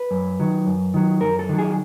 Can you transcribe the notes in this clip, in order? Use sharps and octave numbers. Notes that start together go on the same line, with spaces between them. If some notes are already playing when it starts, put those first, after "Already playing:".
Already playing: B4
F#2
D#3 F#3
F#2
D#3 F#3
F#2 A#4
A4
D#3 F#3
G#4